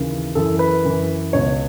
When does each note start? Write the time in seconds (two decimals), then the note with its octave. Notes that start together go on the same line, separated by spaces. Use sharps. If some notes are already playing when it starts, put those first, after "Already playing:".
Already playing: D#2 C#3 E3
0.35 F#2 E3 A4
0.59 B4
0.85 F#2 E3
1.33 C#2 B2 C#5